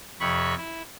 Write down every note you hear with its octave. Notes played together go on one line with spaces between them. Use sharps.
F2 C3 C#5 B5 C#6
E4